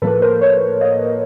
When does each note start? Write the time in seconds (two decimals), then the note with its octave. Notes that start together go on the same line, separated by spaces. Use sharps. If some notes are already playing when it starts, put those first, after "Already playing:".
0.02 A2 F3 A#3 A4 B4
0.22 A#4 C5
0.41 B4 C#5
0.81 D#5 F5